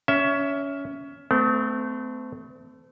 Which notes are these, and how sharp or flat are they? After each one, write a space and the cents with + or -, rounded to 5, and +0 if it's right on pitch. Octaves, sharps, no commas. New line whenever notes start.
C#4 +20 E5 +0
A3 +0 C4 -40